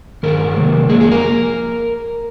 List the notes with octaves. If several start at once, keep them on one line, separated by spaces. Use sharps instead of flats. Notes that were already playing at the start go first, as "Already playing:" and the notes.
G2 D#3 A#4
C3 D#3 G#3
F2 D#3 A#3 G#4
G#4
A#4